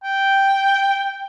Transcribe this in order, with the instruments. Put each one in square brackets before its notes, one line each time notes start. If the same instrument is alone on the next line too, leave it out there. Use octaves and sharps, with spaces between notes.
[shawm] G5